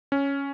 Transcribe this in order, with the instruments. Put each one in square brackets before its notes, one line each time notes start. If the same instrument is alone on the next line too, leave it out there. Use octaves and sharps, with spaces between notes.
[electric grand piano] C#4